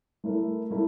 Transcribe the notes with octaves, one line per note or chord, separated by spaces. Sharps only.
A3 E4 A#4
A3 E4 A#4